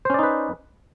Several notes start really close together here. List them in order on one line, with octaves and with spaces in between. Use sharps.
C5 C#4 D5 D#4 B4